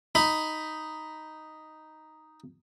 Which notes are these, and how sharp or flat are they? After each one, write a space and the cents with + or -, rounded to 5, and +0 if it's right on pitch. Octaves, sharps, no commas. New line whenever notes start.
D#4 +0 B5 +10